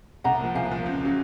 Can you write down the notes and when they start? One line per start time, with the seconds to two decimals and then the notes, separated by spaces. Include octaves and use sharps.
0.24 C2 F#5 A#5
0.39 A#2 F3
0.55 C2 F5 G#5
0.70 A#2 F3
0.86 C#2
1.00 C#3 F#3